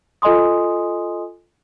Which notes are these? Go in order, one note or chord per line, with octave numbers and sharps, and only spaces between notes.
F4 A4 D#5 G#5 C6 D#6